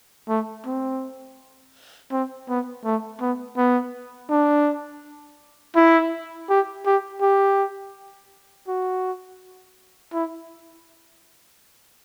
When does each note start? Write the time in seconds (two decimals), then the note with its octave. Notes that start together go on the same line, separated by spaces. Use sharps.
0.29 A3
0.66 C4
2.12 C4
2.49 B3
2.85 A3
3.21 B3
3.58 B3
4.30 D4
5.76 E4
6.50 G4
6.86 G4
7.22 G4
8.68 F#4
10.13 E4